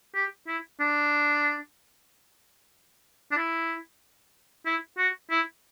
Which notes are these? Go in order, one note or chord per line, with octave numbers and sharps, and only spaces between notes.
G4
E4
D4
D4
E4
E4
F#4
E4